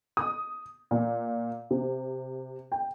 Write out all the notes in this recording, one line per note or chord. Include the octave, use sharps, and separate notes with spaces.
D#6
A#2
C3
G5